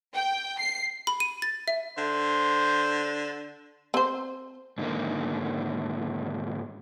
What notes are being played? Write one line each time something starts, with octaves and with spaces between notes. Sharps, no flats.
G5
C7
B5
D#7
A6
E5
D3 C5
C4 C5
G#2 D3 D#3 A#3